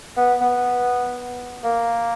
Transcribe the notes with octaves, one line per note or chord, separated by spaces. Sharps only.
B3
B3
A#3